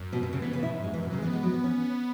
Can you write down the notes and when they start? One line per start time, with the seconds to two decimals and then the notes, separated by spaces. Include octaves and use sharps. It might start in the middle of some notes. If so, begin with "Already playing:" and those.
Already playing: F#2
0.13 B2
0.23 B2
0.33 C#3
0.42 E3 B3
0.53 C#3 B3
0.63 B2 E4
0.73 G#2 C#4
0.83 F#2 G#3
0.94 E3
0.97 F#2
1.03 B2
1.10 C#3 F#3
1.18 G#3
1.22 E3 B3
1.33 G#3
1.43 F#3
1.53 E3
1.64 C#4